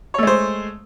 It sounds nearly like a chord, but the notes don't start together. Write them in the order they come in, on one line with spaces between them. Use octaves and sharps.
C#5 A3 G#3 C5